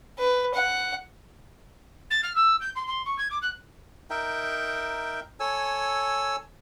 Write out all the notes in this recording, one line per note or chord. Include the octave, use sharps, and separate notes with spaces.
B4
F#5
A6
F6
E6
G6
C6
C6
C#6
G#6
D6
F#6
D#4 A#4 E5 G5
A4 C#5 G#5 E6